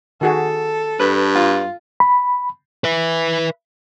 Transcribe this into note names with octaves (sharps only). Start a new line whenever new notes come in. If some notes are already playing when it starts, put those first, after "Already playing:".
D#3 F#4 G#4 A4
G2 B4
F4
B5
B4 E5